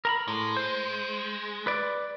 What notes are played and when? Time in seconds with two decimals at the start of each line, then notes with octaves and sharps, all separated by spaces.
0.05 A#4 A#5 B5
0.28 A2 G#3
0.57 C5
1.67 B4 D5